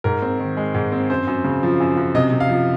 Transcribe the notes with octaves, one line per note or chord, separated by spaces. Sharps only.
G#2 A#4
C4
D#3
G#3
G#2
C4
F#2 C5
F#2
C#3
F3
F#2
F#2
C3 D#5
C3
F5
F3